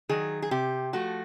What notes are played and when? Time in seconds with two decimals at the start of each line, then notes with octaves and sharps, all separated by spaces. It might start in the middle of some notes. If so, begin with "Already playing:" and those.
0.09 D#3 F#3 G#4
0.42 G#4
0.51 C3 G4
0.93 F3 A3 F#4